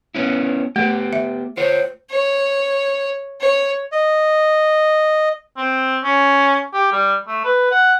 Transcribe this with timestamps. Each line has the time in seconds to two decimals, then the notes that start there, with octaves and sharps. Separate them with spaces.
0.15 B3 C#4 E4
0.76 A3 B3 G4
1.13 E5
1.57 F4 C5 C#5
2.11 C#5
3.41 C#5
3.92 D#5
5.57 C4
6.04 C#4
6.74 G4
6.93 G3
7.28 A3
7.44 B4
7.71 F#5